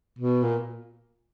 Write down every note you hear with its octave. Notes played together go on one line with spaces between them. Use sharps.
B2
A#2